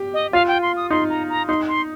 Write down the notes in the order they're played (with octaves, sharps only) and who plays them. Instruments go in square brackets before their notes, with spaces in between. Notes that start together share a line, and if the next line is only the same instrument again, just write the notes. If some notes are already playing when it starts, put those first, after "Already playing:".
Already playing: [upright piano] G4
[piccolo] D#5
[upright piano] F4 [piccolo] F5
[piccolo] G5
C6
D#6
[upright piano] D#4 [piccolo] C6
[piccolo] A#5
A#5
[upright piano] D#4 [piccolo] C6
[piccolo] C6